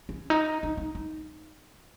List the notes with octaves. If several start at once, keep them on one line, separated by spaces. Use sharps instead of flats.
C#4
D#4
D#4
D#4
D#4